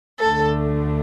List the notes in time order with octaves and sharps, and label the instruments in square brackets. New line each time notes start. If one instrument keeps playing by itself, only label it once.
[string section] D2 D3 A3 A4